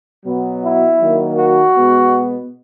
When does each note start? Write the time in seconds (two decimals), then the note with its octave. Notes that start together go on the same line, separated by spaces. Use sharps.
0.24 B2 F#3 B3
0.62 E4
1.00 D#3 F#3 A#3
1.38 F#4
1.76 B2 G#3 B3